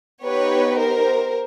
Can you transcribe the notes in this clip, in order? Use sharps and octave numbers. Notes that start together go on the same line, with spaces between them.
B3 D#4 G4 B4 C#5
A#4 C5